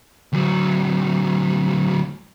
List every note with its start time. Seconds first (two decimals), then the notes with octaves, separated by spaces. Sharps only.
0.33 D2 F#3